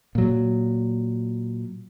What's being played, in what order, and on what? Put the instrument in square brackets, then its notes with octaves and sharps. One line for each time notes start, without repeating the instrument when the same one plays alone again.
[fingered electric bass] A#2 F#3